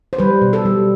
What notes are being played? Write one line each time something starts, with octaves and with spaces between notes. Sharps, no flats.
C5
G3 B4
B2
A4
G3